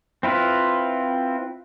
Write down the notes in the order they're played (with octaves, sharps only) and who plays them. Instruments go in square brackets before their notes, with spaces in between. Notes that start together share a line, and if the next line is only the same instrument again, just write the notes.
[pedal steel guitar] C4 E4 F4 B4